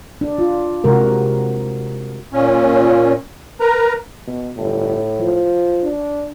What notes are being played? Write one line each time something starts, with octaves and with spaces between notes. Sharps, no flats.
D4
F4
C3 G#3 F#4 A#4
A#2 C#4
A#4 B4 A#5
B2
G1 A2
F3
D4